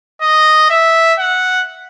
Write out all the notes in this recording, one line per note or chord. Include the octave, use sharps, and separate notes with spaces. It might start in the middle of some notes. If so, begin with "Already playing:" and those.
D#5
E5
F#5